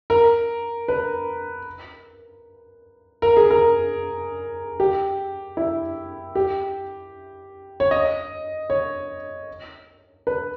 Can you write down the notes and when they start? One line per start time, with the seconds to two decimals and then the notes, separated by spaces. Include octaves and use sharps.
0.10 A#4
0.88 B4
3.22 A#4
3.37 G#4
3.50 A#4
4.80 G4
5.57 E4
6.35 G4
7.80 C#5
7.91 D#5
8.70 C#5
10.27 B4